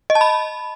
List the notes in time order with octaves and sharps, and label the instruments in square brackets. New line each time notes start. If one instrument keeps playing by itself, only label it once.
[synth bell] D#5
A5
B5